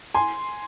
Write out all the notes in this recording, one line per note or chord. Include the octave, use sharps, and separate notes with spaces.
G#5 C6